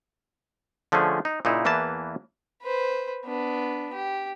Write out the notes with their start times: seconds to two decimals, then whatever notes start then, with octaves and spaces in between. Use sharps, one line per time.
0.92 D3 F3 A3 C#4 G#4
1.25 D#4
1.45 A#2 C#3 D#4 E4
1.65 E2 E3 A#3 B4 A5
2.62 B4 C5
3.25 B3 D4
3.94 G4